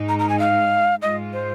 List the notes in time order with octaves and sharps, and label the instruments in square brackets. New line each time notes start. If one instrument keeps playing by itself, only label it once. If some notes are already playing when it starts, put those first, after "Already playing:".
Already playing: [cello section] G#2 G#3 D#4
[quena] A#5
A#5
G#5
F5
[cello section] G#2 G#3 F4 [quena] D#5
[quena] C5